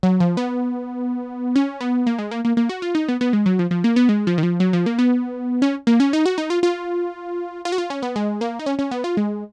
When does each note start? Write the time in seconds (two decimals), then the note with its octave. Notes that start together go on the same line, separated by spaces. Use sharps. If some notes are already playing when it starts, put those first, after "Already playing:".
0.03 F#3
0.20 F3
0.37 B3
1.56 C#4
1.81 B3
2.07 A#3
2.19 G#3
2.31 A#3
2.45 A#3
2.57 A#3
2.69 F#4
2.82 F4
2.95 D#4
3.09 B3
3.21 B3
3.33 G#3
3.46 F#3
3.59 F3
3.71 F3
3.84 A#3
3.96 B3
4.09 G#3
4.27 F3
4.38 D#3
4.43 F3
4.60 F#3
4.73 F3
4.86 A#3
4.99 B3
5.62 C#4
5.87 A#3
6.00 C#4
6.13 D#4
6.26 F#4
6.38 D#4
6.50 F4
6.63 F4
7.65 F4
7.72 F#4
7.78 F4
7.90 C#4
8.02 B3
8.16 G#3
8.41 A#3
8.59 D#4
8.66 C#4
8.79 C#4
8.91 B3
9.04 F4
9.17 G#3